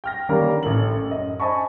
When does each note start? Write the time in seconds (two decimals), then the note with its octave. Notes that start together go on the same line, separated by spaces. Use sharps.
0.04 G5 F6 A#6
0.29 D3 D#3 G3 A#3 C#4 A#4
0.63 A1 A4 F#7
1.07 F#2 D#5
1.40 C5 D#5 G#5 A5 B5 C#6